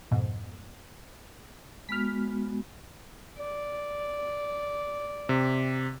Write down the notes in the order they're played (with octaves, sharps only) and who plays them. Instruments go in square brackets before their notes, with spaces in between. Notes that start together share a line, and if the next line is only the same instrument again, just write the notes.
[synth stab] F2 G#2 B2
[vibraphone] G#3 B3 F#4 [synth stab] F6 B6
[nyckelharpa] D5
[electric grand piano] C3